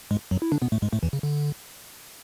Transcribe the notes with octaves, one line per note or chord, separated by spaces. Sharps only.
G#2 G#3
F#2 F#3
E4
D3 D4
B2 B3
A2 A3
G#2 G#3
A2 A3
E2 E3
C#3
D3